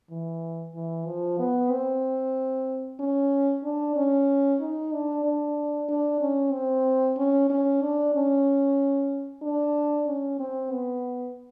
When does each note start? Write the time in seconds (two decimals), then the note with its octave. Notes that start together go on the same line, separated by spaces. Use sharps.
0.10 E3
0.74 E3
1.06 F3
1.39 B3
1.71 C4
3.00 C#4
3.64 D4
3.96 C#4
4.60 D#4
4.92 D4
5.25 D4
5.89 D4
6.21 C#4
6.53 C4
7.17 C#4
7.50 C#4
7.82 D4
8.14 C#4
9.42 D4
10.07 C#4
10.39 C4
10.71 B3